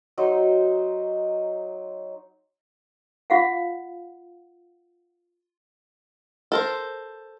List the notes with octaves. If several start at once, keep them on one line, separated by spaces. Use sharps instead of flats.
F#3 D#4 C5 D#5
F4 F5 F#5
A4 A#4 C5